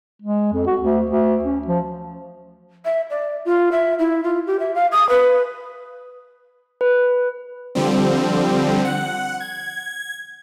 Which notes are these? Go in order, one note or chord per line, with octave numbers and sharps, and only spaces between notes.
G#3
F2
F#4
D2
D2
C#4
F3
E5
D5
F4
E5
E4
F4
G4
E5
F5
D#6
B4
B4
D3 F3 G3 C4
F#5
G#6